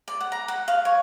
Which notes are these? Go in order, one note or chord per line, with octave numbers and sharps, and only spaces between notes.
D5
F#5
A#5
F#5
F5
C#5